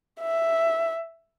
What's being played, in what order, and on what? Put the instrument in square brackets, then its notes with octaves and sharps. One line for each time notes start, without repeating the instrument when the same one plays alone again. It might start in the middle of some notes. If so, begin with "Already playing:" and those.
[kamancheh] E5